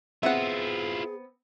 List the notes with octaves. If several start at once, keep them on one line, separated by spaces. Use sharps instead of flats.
B3 C4 E4 F4 G#4 E5 F#5